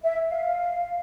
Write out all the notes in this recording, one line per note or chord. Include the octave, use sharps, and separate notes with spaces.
E5
F5